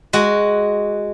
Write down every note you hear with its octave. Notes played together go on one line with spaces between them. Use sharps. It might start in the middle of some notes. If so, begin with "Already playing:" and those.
G#3 F#4